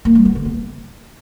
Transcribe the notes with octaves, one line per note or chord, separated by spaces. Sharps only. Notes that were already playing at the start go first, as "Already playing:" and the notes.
A#3
G3
B3
D3
B3